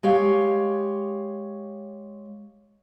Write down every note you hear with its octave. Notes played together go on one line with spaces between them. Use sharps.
G#3 G4 C#5 F5